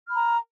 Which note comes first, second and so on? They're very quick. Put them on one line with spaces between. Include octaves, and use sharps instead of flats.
F6 B5 A#5